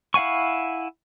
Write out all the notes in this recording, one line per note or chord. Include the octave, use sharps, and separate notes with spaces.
E4 F5 F#5 G#5 C#6